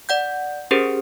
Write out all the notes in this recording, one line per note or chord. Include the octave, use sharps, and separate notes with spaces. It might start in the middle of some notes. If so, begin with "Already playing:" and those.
D5 F#5 G6
C#4 G4 G#4 A#4 C5